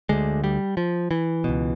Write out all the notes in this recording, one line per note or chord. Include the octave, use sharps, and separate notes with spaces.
D2 D3 G#3
G3
F3
E3
C#2 B2